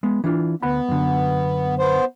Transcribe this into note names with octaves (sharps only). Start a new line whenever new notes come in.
G#3 B3
E3 D4 F4
D2 B3 F#5 B5
F#2 D3
B3 C5